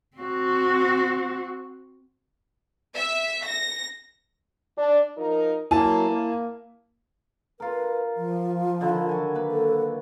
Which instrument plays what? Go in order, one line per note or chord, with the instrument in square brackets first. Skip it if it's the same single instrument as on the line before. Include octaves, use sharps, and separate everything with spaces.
[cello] C4 F#4
[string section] E5
A#6
[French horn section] D4
F3 D#4 A#4
[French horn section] F#3 A#3 [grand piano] E4 G#5 A5
[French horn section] A#3
[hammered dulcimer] F4 A#4 [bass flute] B4
[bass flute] F3
[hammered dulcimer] D3 D#3 E4
F#3 G#5
A#3 B4 B5
[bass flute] A4